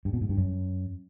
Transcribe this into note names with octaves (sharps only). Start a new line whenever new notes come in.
G2
B2
G#2
G2
F#2